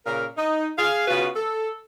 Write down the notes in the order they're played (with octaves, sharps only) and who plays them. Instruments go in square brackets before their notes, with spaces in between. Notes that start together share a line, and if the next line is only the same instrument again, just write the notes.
[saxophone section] A#2 C#3 A#4
D#4
G#4 F5
C#3 B3 F4 F#4 B4
A4